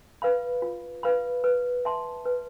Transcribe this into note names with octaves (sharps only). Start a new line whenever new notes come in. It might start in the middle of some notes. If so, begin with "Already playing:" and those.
B4 F5 B5
F4
B4 F5 B5
B4
E5 A5 C6
B4